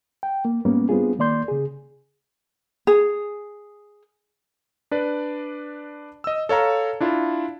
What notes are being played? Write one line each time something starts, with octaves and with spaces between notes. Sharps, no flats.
G5
A#3
G#2 G3 A#3 B3 C#4
G3 B3 C4 D4 F4 G#4
D#3 A#3 D5 C6 G6
C#3 G#4
G#4
D4 B4 D5
D#5 E6
A4 C#5 F5 A#5
D4 E4 F4